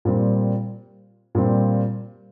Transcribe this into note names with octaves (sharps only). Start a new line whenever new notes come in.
A#2 G3 C4
A#2 G3 C4 F4